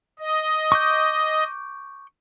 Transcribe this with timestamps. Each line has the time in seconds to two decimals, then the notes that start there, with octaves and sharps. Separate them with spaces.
0.19 D#5
0.72 C#6 D6 G6